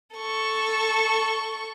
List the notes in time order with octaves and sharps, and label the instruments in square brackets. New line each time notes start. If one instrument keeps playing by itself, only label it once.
[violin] A4 C#6